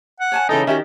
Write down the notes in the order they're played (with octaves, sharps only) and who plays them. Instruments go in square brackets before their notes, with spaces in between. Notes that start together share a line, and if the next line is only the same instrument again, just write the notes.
[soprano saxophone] F#5
[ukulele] C#5 G#5 A5
[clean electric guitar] C#3 E3 D#4 [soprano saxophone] A4
[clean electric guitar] D#3 [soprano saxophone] C#4 [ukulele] F#4 G4 E5